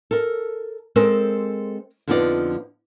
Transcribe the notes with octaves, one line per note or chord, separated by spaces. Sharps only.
A4 A#4
G#3 C4 A4 A#4 C5
F2 D3 F3 B3 D#4 D5